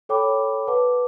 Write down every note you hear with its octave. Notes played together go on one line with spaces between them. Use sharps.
A4 C#5 G5 B5 D6
B4 F#5 A5 D6